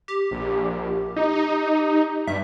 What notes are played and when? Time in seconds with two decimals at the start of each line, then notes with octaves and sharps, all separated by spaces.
0.08 G4
0.31 A#1
1.16 D#4
2.27 G2 E5